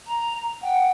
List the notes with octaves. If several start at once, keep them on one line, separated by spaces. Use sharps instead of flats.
A#5
F#5 G5